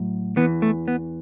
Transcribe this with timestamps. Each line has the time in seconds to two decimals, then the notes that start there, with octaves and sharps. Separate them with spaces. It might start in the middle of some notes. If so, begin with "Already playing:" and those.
Already playing: A2 F#3
0.37 E2 E3 B3
0.62 A3
0.88 B3